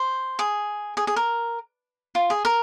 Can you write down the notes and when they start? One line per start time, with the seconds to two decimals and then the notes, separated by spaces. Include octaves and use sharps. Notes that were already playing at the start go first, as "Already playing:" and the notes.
Already playing: C5
0.39 G#4
0.97 G#4
1.07 G#4
1.16 A#4
2.15 F4
2.30 G#4
2.45 A#4